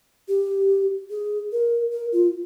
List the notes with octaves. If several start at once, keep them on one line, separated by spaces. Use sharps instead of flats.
G4
G#4
A#4
A#4
F4